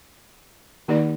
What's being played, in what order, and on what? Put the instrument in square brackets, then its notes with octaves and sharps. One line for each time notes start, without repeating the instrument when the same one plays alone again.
[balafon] D#3 A#3 D#4 G4 D5